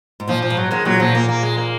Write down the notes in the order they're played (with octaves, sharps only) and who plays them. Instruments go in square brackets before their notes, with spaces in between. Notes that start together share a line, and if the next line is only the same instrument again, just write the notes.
[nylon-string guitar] G#2
[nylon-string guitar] A#2 [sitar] F3
[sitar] F3
[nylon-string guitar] G#2
[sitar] F#3
[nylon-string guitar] D#3 [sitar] G#3
[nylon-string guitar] A#2 [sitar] F#3
[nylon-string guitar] A#2 [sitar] F3
[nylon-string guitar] A#2 [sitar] A#3
[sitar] A#3
G#3
A#3